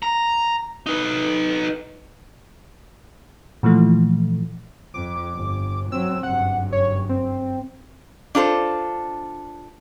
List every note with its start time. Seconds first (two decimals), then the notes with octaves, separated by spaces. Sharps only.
0.03 A#5
0.86 D#4 B4
3.63 A#2 E3 F3 A3
4.94 F2 D6
5.34 G1
5.92 F#3 C4 E6
6.23 F#1 G2 F#5
6.72 C#5
7.09 C4
8.35 D4 F4 A4 C5